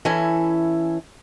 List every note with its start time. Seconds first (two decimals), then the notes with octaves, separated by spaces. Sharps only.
0.05 E3 C#4 E4 A4 G#5